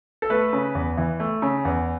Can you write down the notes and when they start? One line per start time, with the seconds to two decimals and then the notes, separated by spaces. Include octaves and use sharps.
0.22 A4
0.30 A3 B4
0.53 C#3
0.75 E2
0.97 E3
1.20 A3
1.42 C#3
1.65 E2